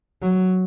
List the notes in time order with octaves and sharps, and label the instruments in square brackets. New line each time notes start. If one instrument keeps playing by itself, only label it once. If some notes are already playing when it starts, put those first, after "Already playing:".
[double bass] F#3